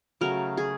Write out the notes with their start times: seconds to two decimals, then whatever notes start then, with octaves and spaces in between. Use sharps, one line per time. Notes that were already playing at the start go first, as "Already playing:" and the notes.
0.21 C#3 F#3 A3 A#4
0.57 G#4